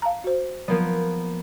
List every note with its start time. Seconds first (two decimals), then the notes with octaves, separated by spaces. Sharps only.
0.02 F5 A5 A#5
0.24 F#4 C5
0.68 F3 F#3 A#3 B3 A#4